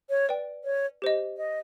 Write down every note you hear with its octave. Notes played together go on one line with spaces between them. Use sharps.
C#5
B4 D5 G5
C#5
G4 C5 D#5
D#5